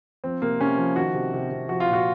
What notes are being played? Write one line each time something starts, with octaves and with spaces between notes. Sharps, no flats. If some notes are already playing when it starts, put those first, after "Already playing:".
F3 C4
C3 A#3
C3 C#4
F3
D#3 F#4
C3
C3
C3
F3 F#4
F4
A#2
F#4